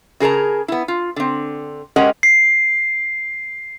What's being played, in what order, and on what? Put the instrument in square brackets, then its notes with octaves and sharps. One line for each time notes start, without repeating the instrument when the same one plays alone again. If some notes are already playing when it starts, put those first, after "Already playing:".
[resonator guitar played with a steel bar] C#3 G#4 A#4 A5 A#5
B3 E4
F4
D3 C4
G#3 C#4 G4 A#4 D#5 F#5
[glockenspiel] C7